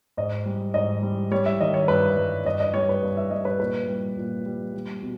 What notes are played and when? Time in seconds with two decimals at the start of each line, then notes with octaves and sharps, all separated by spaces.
0.17 G#2 D#5
0.46 G3
0.74 G#2 D#5
1.03 G3
1.31 G3 C#5
1.46 E5
1.61 D#3 D#5
1.74 C#5
1.88 G2 B4
2.17 G2
2.45 G2 D#5
2.60 D#5
2.74 G3 C#5
2.89 B4
3.03 G2
3.17 E5
3.31 G3 D#5
3.45 B4
3.60 A#2 B4
3.88 G3
4.17 A#2
4.46 G3
4.74 G3
5.02 B2